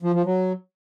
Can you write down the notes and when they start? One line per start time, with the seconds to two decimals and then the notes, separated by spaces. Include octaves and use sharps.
0.02 F3
0.14 F3
0.25 F#3